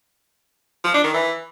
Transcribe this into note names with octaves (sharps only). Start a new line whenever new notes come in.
F3
D4
D#3
E3